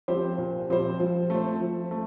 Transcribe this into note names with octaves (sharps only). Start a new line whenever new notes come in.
F3 C4 G4 C5
A#2
F3 C4 G4 C5
F3
A3 C4
F3
A3